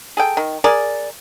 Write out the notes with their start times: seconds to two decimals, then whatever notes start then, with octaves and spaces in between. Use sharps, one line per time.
0.17 G#4 A4 G5
0.37 D#3
0.64 G#4 A#4 D5